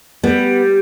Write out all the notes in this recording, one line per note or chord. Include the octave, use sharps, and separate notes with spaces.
G3 B3